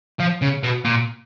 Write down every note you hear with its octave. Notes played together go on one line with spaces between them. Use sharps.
F3
C#3
B2
A#2